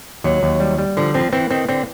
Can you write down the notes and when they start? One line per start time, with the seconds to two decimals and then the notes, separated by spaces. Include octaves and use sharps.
0.24 D#2 F#3
0.43 D#2
0.60 G3
0.78 G3
0.97 D3 F3
1.14 F3 C4
1.32 E3 C4
1.50 D#3 C4
1.69 D3 C4